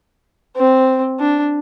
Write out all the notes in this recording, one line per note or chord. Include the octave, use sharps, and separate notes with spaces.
C4
D4